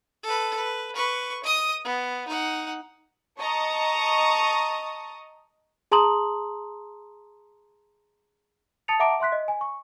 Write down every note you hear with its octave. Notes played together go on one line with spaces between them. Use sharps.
A4 B4
B4
B4 C#6
D#5 D#6
B3
D#4 F#5
D#5 A5 A#5 C#6 D#6
G#4 A5 A#5 C6 D#6 F#7
A5 D#6 A6 C#7 F7
E5 F#5 A5 A#5 D6 D7
E5 C6 F#6 B6
D#5
G#5
C#6